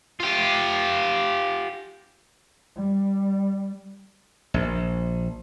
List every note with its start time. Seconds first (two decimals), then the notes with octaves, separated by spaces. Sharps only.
0.20 F4 G4
2.76 G3
4.54 A#1